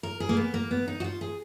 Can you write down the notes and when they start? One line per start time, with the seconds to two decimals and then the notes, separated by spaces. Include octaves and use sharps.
0.03 A#4
0.20 G#4
0.29 A#3
0.37 B3
0.54 A#3
0.71 B3
0.87 D#4
1.00 F#4
1.04 F4
1.21 G#4